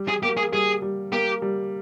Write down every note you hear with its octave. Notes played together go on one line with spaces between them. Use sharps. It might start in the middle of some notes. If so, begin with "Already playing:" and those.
Already playing: G3
G#4
A#3 G4
G#4
G3 G#4
G3
A#3 G4
G3